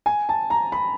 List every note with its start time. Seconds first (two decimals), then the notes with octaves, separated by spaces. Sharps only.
0.06 G#5
0.29 A5
0.50 A#5
0.72 B5